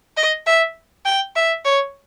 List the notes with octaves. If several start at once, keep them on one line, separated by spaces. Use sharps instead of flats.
D#5
E5
G5
E5
C#5